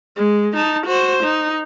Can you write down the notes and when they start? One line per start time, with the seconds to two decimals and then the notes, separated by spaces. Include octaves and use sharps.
0.16 G#3
0.56 D#4 A5
0.86 F#4 C5
1.23 D#4